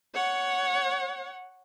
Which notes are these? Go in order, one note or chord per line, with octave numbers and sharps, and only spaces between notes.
C#5 F#5